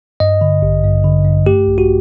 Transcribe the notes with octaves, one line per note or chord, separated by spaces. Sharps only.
G2 D#5
D3
A1
G2
D3
G2
A3 G4
A#1
F#4